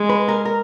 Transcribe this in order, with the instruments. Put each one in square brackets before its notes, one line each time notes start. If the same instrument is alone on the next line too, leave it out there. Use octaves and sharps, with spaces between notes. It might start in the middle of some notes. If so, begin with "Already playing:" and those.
Already playing: [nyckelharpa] G#3
[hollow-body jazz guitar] B4
A#4
A#4